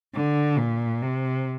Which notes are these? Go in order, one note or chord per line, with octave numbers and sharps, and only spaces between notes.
D3
A#2
C3